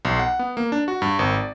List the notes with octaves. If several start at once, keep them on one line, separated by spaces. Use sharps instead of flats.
B1
F#5
B3
A#3
D4
F#4
G2
G#1
D5